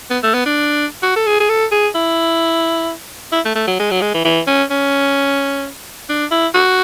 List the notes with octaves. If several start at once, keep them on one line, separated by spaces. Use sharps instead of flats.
B3
A3
B3
D4
F#4
A4
G#4
G#4
A4
G#4
E4
E4
A3
A3
F#3
G#3
F#3
G#3
E3
E3
C#4
C#4
D4
E4
F#4